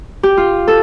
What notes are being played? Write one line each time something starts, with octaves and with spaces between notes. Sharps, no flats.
G4
F4
A4